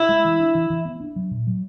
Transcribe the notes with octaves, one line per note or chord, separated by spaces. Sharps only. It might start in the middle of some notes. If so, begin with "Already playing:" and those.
Already playing: E4
G#3
E3
D4
E3
E3
B3
D4
F#3
A#2
F#3